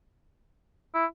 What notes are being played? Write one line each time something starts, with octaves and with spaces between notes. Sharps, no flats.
E4